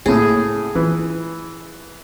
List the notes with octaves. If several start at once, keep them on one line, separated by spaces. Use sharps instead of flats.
A2 C#3 A#3 C#4 G#4
E3 F4